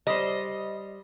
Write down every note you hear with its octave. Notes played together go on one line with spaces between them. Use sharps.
G3 C5 D#5